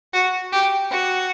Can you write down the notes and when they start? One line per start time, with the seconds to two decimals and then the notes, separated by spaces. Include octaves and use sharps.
0.13 F#4
0.52 G4
0.91 F#4